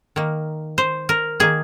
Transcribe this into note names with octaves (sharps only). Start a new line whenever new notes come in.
D#3 A#3
C5
A#4
D#3 A#3 G#4